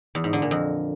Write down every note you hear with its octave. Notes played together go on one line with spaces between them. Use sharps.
E2
G#2
D3
A#2
F2